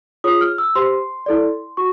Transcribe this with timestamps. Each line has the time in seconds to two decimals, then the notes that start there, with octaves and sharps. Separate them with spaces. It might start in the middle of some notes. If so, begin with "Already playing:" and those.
0.24 F4 G#4 C#5 D#6
0.41 F6
0.58 E6
0.75 G4 C5 C6
1.26 E4 A4 D5
1.77 F#4 C#6